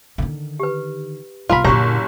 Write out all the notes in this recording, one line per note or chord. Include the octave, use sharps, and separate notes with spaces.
D3 D#3
G4 B4
C2 B3 F4 A#4 B5
F#1 A#2 D3 G4 A#5 C#6